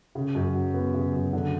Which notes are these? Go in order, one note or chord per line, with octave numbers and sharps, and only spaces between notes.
C#3
F#2
F#3
B3
C#3
F#2
D3